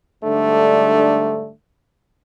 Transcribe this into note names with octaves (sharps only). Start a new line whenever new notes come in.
G#2 D3 G3 A3 D4